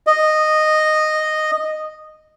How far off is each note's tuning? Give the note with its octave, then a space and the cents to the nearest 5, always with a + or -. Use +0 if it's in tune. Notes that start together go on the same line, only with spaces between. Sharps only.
D#5 -10